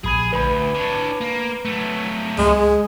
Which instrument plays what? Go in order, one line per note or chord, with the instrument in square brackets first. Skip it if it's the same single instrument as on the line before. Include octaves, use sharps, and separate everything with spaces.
[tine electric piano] A#1 B5 G#6 [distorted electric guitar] G#4
[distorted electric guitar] D2 [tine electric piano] B4 B5
[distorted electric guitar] D4 C#5
A#3
F#3 A3
[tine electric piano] C#2 [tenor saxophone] G#3